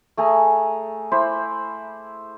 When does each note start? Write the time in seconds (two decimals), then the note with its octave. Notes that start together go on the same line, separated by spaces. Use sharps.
0.17 A3 G#4 G#5 A#5
1.12 E4 C5 B5 D6